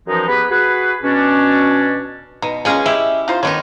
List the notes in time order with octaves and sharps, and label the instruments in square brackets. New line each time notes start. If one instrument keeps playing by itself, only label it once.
[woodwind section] F#2 E3 F3 G#3 D#4
B3 G4 G#4 B4
F#4 G#4 B4
B2 C#4 D4
[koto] B2 [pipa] D#4
[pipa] F3 A#3 [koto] G#3 C#4 G#4
[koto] E4 G4 [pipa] E5
[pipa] D#4 F4 C5
[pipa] D3 C#5 [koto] D#3 B3 D#4